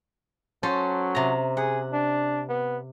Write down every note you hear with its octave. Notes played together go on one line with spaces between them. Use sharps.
F#3 C#4 A4 C5
C3 A#5
G#4 F#5
D4
B3